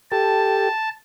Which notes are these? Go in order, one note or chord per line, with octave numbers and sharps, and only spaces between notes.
G4 A4 A5